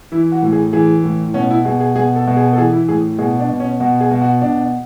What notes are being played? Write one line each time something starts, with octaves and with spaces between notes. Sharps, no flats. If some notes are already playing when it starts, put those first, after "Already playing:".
E3 E4
F#4
A2
G#4
E3 G#4
A2
B2 C#4
E4
B2 G#4
G#4
B2 G#4
A4
B2
G#4
A4
E3 G#4
E4
A2 G#4
B2 G#4
D4
B2
C#4
B2 F#4
G#4
B2
F#4
B2 D4